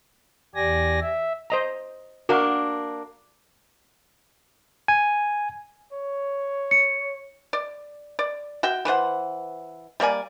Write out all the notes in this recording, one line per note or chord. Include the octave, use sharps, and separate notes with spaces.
E2 G4 D5 G#5 A#6
E5
C5 D#5 A#5
A#3 D4 F#4 A#4
G#5
C#5
C#7
D5
D5
F#4 E5 G5
E3 B4 C5 F#5
G3 A#3 D5 G#5